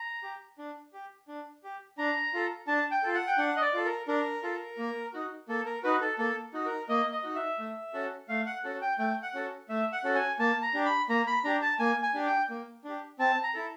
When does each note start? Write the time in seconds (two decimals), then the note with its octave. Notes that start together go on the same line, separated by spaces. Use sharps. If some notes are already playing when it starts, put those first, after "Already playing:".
Already playing: A#5
0.23 G4
0.58 D4
0.93 G4
1.28 D4
1.63 G4
1.98 D4 A#5
2.34 F4 A4
2.67 D4 A5
2.91 G5
3.03 F4 A4
3.14 F#5
3.27 G5
3.38 D4 F#5
3.56 D#5
3.62 D5
3.74 F4 A4
3.85 A#4
4.08 D4 A#4
4.43 F4 A4
4.78 A#3
5.13 D#4 F#4
5.48 A#3 A4
5.65 A#4
5.83 D#4 F#4 B4
6.01 A4
6.18 A#3 A4
6.53 D#4 F#4
6.66 A#4
6.89 A#3 D#5
7.12 D#5
7.23 D#4 F#4
7.35 E5
7.59 A3
7.93 C#4 F#4 A4
8.29 A3 F5
8.46 F#5
8.64 C#4 F#4 A4
8.82 G5
8.99 A3 G5
9.23 F#5
9.34 C#4 F#4 A4
9.69 A3 E5
9.92 F#5
10.04 C#4 F#4 A4
10.15 G#5
10.39 A#3 A5
10.62 A#5
10.74 D4 G4
10.86 B5
11.09 A#3 A#5
11.27 B5
11.44 D4 G4 A#5
11.62 A5
11.79 A#3 G#5
12.03 G#5
12.14 D4 G4
12.26 G5
12.50 A#3
12.84 D4 G4
13.19 C4 A5
13.43 A#5
13.54 E4 A4